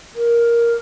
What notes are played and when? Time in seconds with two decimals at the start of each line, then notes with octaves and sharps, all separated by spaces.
0.16 A#4